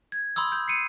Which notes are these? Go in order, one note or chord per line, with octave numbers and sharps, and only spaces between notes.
G#6
B5 C6 D#6 E6
B5 G6
C7 C#7 D#7